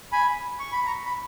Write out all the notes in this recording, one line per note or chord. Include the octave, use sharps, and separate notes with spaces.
G#5 B5
C#6
B5
A#5 C#6
B5